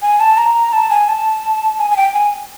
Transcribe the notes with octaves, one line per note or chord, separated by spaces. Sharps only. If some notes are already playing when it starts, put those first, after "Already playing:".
G#5
A5
A#5
A5
G#5
A5
G#5
G#5
G5
G#5